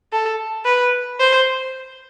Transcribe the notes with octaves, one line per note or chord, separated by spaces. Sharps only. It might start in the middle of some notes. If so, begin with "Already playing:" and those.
A4
B4
C5